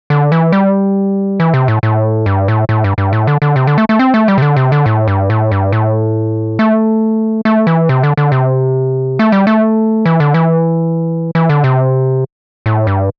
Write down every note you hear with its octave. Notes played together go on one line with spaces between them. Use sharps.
D3
E3
G3
E3
C3
A2
A2
G2
A2
A2
G2
G2
A2
D3
D3
C3
D3
A3
A3
C4
A3
G3
C3
D3
C3
D3
A2
G2
A2
G2
A2
A3
A3
E3
C3
D3
D3
C3
A3
G3
A3
E3
D3
E3
E3
D3
C3
A2
G2